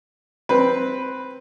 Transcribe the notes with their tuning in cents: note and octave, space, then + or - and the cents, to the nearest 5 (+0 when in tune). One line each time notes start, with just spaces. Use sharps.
C4 +0 B4 +0